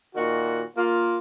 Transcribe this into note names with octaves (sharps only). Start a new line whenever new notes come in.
A#2 D#3 F#4
A#3 F4